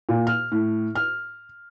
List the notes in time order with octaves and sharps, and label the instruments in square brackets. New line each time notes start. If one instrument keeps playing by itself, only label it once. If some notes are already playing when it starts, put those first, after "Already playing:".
[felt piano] A#2
F6
A2
F6